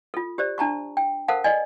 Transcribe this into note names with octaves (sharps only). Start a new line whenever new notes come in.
F4 A4
G4 C5 D5
D4 A5 A#5 C#6
G5
A4 A#4 C5 F5 F#5 A5
D5 D#5 G#5